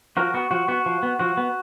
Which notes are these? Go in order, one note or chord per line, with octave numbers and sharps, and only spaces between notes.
F3 F#4 A#4
B3 F#4
F3 F#4
B3 F#4
F3
B3
F3 F#4
B3